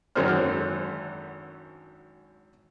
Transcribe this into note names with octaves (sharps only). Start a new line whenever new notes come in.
G#1 F#2 D3 C#4 C5 F6